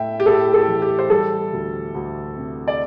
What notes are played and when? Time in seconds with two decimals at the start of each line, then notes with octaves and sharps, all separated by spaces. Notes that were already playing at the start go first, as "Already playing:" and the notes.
Already playing: A2 A3 E5 G5
0.20 G4
0.26 A2 A4
0.54 A4
0.68 E3
0.82 G4
0.99 C5
1.10 G3 A4
1.52 D2
1.95 D2
2.37 C3
2.68 D5